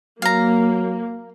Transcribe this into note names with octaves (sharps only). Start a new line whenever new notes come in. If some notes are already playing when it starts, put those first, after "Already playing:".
F#3 A#3 F5 A#5